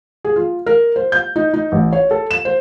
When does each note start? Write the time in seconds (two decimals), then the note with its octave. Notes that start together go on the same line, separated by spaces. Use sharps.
0.25 G#4
0.36 F4
0.66 A#4
0.96 C5
1.12 G6
1.36 D#4
1.54 D#4
1.72 A1
1.92 C#5
2.11 A4
2.31 E7
2.45 C5